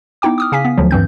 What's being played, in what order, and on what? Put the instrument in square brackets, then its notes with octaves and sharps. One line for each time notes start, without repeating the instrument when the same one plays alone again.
[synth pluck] B3 D#4 E4 G5 D6
D6 D#6 F6
C#3 F5 G#5 B6
B3
D2 D3 F3 F#3
G2 E3 C4 G6